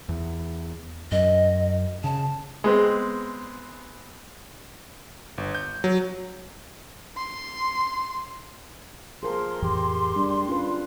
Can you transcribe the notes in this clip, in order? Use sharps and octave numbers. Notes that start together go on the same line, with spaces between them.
E2
F#2 D#5
C#3 A5
G#3 B3 C4
G1
G6
F#3
C6
F3 G#4 A#4 C6
F2 A2 E3 G4
G3 D4
C#4 F4 B4